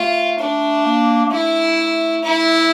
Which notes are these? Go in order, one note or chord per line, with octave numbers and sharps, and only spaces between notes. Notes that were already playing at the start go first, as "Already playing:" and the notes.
Already playing: A3 F4
D4
A#3
A#3
A3 E4
E4